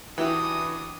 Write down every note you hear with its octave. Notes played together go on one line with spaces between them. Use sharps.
E3 D4 E4 F#4 G4 B4 D#6